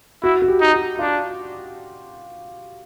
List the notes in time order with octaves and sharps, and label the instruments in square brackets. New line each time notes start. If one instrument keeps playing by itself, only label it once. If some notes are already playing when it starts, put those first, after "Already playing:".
[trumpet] E4 [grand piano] F#4
[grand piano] F#4
G4
[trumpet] D#4
[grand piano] F#4
[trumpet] D4 [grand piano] F4